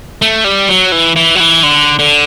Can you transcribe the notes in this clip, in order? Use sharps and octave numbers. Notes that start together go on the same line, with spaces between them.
A3
G3
F#3
E3
E3
F#3
E3
D3
D3